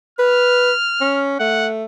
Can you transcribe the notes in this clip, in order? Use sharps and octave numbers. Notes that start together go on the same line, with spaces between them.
B4 F6
C#4
A3 F#5